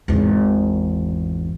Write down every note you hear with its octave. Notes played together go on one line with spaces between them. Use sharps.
G#1 E2